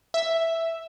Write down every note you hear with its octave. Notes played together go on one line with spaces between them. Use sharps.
E5